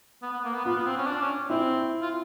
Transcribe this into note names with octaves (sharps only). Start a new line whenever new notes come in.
B3
B3
A#3
B3
B3 F4
B3
C4
C#4
D4
C#4
C4 E4
F4